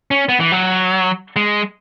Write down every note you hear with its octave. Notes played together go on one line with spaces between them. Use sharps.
C#4
B3
E3
F#3
G#3